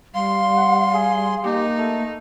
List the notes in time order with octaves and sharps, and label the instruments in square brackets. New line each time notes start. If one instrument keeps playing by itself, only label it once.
[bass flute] G3 [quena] F5 [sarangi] C6
[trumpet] F#5
G#4
[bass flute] A#3 [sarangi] D#4 [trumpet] G4
[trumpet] A3